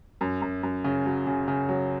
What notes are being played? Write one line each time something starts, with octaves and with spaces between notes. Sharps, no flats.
F#2
F#2
F#2
C#3
F#3
C#3
C#3
F#3